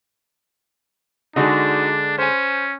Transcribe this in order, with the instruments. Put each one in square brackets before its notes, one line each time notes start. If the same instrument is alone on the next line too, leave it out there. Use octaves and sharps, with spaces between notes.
[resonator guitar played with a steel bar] D3 G#3 [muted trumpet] D4 [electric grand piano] D#4 F#4 D#5
[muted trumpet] C#4 [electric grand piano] C5 G#5